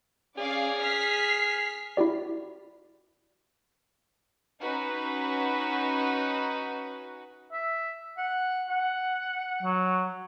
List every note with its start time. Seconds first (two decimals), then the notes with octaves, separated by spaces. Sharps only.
0.38 C#4 G#4 D5 F5
0.82 F6 B6 C7
1.97 E4 F#4 G4 D5
4.61 C#4 D#4 F#4 B4
7.52 E5
8.17 F#5
8.69 F#5
9.63 F#3